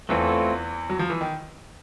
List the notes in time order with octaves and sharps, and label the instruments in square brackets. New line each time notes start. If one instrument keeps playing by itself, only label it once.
[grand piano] E2 E3 [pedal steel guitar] A3 C4 F4 A4 C#5
[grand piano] F#3
F3
E3
D#3